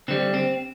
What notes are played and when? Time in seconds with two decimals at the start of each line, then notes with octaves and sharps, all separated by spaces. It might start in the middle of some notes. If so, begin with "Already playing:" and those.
0.08 D3 G3 C4
0.34 C4